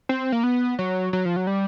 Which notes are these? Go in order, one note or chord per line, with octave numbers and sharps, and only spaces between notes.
C4
A#3
B3
F#3
F#3
F3
F#3
G3